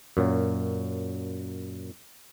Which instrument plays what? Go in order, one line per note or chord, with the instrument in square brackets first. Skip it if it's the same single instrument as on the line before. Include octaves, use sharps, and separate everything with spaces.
[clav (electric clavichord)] F#2 A#2 F#3